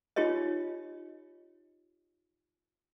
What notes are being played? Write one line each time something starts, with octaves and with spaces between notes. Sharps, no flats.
D#4 F4 G4 C#5 D#5